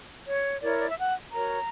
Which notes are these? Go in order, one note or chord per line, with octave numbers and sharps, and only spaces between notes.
C#5
E4 A#4 C#5 D5
D5
E5
F#5
F#4 A#4 C#5 A#5